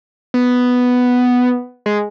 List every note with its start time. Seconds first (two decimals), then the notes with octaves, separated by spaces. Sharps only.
0.34 B3
1.86 G#3